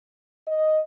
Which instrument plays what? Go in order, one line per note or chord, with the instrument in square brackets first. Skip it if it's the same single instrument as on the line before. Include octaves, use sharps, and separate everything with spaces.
[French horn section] D#5